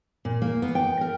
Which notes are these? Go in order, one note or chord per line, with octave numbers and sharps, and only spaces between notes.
A#2
A#3
B3
G5
A#4